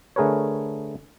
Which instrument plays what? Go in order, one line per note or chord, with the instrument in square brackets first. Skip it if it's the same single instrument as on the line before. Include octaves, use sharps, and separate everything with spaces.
[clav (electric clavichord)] D3 A3 G#4 A#4 B4 C#5